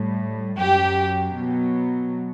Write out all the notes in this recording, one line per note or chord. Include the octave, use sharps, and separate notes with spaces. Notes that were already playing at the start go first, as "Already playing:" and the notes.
Already playing: A2 G3
F#2 F#3 G4
B2 F#3